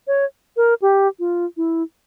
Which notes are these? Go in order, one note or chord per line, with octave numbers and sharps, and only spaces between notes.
C#5
A#4
G4
F4
E4